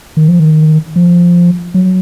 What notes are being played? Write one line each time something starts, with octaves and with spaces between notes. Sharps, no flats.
D#3
F3
D#3
F3
F#3